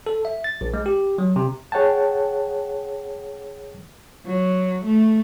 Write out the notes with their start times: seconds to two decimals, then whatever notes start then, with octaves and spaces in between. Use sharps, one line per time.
0.07 A4
0.25 E5
0.44 A6
0.61 A#1
0.74 G#3
0.86 G4
1.18 F#3
1.36 C3
1.72 G#4 C#5 F#5 G5 A5
4.26 F#3
4.84 A3